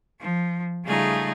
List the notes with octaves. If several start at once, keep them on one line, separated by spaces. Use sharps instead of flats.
F3
C#3 G3 A3 D#4 F4 G#4